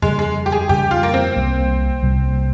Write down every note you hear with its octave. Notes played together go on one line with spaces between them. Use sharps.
F2 C#3 G3 G#3
G#3
G4
G#4
F2 C#3 G3 G4
F4
A#3
C4
C2 C3 G3 A#3
C2 C3 G3 A#3